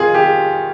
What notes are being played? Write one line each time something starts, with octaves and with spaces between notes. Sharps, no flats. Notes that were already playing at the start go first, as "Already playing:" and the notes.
Already playing: F2 D#3 F4 G#4
G4